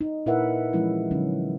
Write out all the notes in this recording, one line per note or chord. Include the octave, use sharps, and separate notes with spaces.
D#4
A#2 E4 A#4 B4 E5 F#5
E3 F3 G#3 C#4 D#4 E4
D3 F#3 C#4 D#4